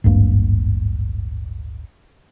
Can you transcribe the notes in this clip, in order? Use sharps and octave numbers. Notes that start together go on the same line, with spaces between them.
D1 G#1 G2 A#3